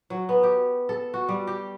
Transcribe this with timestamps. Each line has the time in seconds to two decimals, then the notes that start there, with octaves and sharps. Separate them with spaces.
0.10 F#3
0.29 B3
0.43 G4
0.89 A4
1.14 F#4
1.29 G3
1.47 G4